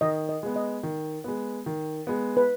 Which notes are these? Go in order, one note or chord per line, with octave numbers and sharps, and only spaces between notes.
D#3 D#5
D#5
G#3 B3
D#5
D#3
G#3 B3
D#3
G#3 B3
B4